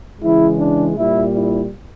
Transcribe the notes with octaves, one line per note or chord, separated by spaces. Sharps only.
C#3 E3 G#3 E4
D4
A#2 G3 E4
E4